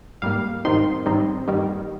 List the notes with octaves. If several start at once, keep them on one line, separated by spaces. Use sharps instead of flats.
G#2 G3 A#3 F5
G#2 D#3 G3 C4 D#4 C6
G#2 D#3 G3 C4 D#4
G2 D#3 G3 A#3 D#4